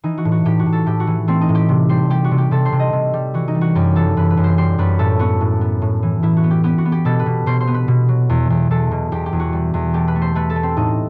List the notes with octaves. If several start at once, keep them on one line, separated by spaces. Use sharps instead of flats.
E3 D#4
F#4
A2
F#4
A2 G4
F#4
A2
A4
A2 G4
F#4
E3
A3 C4
D#4
A2
G4
C3
G3 C5
G3 G4
F#4
C3
G4
C3 A4
C5
C3
D#5
C3
G3
E3 F#4
D#4
G3
F#4
F#2 G4
E3 A4
F#2 B4
B4
F#2
C5
G3 C5
F#2 B4
A2 A4
B3 F#4
A2
B3
A2
E3
A2 E4
F#4
B3
G4
B3 G4
F#4
B3
G4
B2 A4
B4
B2
B2 C5
C5
B3
B4
B2
F#3
E2
E2
E2 A4
B2
E2 G4
G4
E2
F#4
G3
E2
A3 G4
B4
A3
C5
A3 B4
A4
A3
C4
A2 D#4